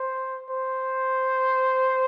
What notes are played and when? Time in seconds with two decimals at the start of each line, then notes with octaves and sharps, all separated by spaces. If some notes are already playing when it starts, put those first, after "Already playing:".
Already playing: C5
0.50 C5